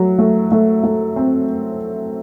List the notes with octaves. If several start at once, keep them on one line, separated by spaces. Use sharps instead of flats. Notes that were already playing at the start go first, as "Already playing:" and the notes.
Already playing: F#3 A3
A3
A3
A3
C4